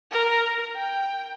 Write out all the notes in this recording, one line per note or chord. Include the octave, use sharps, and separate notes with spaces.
A#4
G5